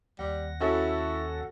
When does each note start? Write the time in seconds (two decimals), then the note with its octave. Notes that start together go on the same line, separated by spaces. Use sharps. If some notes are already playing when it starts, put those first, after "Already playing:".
0.19 D#2 G3 F#5 A#6
0.60 C#4 E4 F#4 A4